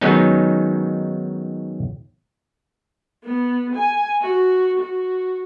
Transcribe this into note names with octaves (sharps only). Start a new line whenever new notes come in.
D#3 F#3 G#3 B3 C#4 D#4
B3
G#5
F#4
F#4